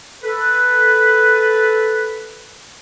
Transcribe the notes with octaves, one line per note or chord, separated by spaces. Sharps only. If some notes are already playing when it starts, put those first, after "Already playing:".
A4 B4